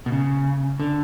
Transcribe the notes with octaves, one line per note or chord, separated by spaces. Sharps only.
B2
C#3
D3